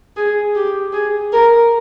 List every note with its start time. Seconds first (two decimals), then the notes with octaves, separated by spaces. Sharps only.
0.16 G#4
0.55 G4
0.93 G#4
1.33 A#4